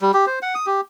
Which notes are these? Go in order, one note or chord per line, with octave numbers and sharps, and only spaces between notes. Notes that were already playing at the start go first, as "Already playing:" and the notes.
G3
G4
C5
F#5
D#6
G4